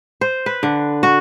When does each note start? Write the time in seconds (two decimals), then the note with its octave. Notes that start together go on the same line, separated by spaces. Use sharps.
0.21 C5
0.46 B4
0.63 D3
1.03 F#4